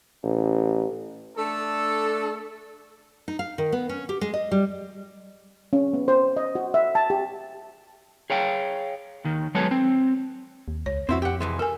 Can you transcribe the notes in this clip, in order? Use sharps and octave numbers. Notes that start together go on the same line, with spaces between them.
A1
A3 D4 A4
D#4
F5
D#3
B3
C#4
G4
G#3
D#5
G3
C#4
B3
C5
D#5
F#4
E5
A5
G4
G#4 C#5 F5 G5
D#2 D#3
F#3 G#3 B3 A4 B4 C#5
C4
D#2
C#2 C#5
F2 C4 E4 F#4
G4 F#5
C2 E3 G#3
A4 A#4 G#5